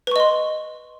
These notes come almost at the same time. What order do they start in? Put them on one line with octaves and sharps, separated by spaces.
B4 C#6 D#5 C6